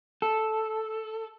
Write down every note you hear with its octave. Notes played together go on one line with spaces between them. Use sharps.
A4